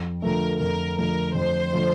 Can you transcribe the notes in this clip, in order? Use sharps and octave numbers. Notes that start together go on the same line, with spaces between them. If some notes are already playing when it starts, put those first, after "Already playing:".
Already playing: F2
D3 F3 A3 A#4
F2 A#4
D3 F3 A3 A#4
F2 C5
D3 F3 A3